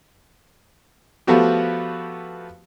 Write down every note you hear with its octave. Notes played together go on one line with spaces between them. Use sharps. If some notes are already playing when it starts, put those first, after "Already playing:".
F3 A3 B3 F#4 G4